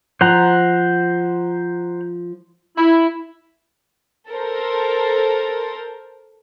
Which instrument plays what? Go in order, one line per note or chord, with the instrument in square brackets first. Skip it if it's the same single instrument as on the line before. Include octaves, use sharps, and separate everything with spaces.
[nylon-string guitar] F3 [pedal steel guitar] C5 F#5 A#5
[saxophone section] E4
[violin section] A4 A#4 C5